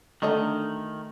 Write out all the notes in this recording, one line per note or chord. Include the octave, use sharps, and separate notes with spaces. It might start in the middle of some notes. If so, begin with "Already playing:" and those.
D3 D#3 A3 F#4 D#5 A#5